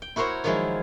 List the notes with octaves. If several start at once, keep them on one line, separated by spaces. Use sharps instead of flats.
G5
E4 F#4 A#4 C5 C#5
D#3 F3 F#3 G#3 E4